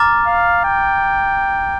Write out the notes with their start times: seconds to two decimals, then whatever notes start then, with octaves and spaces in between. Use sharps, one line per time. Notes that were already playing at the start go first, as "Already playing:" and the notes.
Already playing: A#5 D6 F6 A6
0.26 F5
0.65 G5